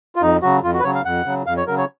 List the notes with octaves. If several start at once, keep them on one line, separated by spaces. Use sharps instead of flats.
F4
F2 D#4
C#3 F#3 F#4
F2 F4
F#4
B4
C#3 F#3 C#5
F5
F2 F#5
C#3 F#3
F2 F5
C#5
C#3 F#3 A#4
C#5